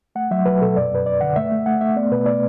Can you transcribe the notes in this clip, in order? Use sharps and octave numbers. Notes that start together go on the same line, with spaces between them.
A3 F#5
F#3 E5
F#3 B4
B2 A4
F#2 D5
F#2 B4
F#2 D5
D3 F#5
A3 E5
A3
A3 F#5
A3 E5
B3 D5
B2 B4
D5